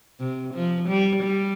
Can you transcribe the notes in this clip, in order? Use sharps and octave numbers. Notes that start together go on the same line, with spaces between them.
C3
F3
G3
G3